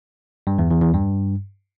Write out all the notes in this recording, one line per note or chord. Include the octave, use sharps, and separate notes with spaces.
G2
E2
E2
E2
G2